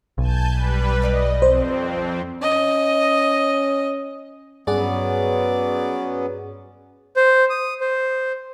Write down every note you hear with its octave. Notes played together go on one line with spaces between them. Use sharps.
B1 G#5 A5 G6
G3 B4
B4 D5 D#5 F5
F2 C4 C5
C#4 D#5
G2 F#3 B3 C#4 G#4 D5 F#5
C5
D#6
C5